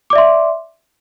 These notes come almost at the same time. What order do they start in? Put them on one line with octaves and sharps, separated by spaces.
D6 D5 E5 C6